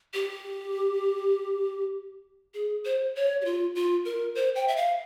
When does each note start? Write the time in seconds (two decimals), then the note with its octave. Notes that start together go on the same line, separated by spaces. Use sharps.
0.14 G4
2.54 G#4
2.85 C5
3.16 C#5
3.41 G4
3.45 F4
3.75 F4
4.05 A#4
4.35 C5
4.55 G5
4.68 E5
4.76 F5